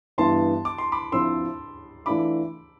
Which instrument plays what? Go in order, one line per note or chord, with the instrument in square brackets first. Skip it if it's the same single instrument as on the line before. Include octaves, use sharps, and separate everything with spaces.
[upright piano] G2 E3 B3 E4 [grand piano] A5 C6
[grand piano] D6
C6
B5 D6
[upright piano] D2 D3 F3 C4 E4 [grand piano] C6 E6
[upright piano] E3 A3 D4 F4 [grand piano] B5 D6